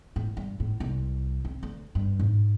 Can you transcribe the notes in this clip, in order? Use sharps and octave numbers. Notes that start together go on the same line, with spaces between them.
A2
G2
A2
C2
C4
D2
G2
G#2